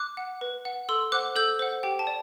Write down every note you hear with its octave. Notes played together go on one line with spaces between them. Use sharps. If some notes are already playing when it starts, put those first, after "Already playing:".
Already playing: D6 F#6
F#5
B4
F#5
A4 C6 E6
C5 F#5 D6 F#6
A4 E6 G6
C5 F#5
G4 G5
A5
D5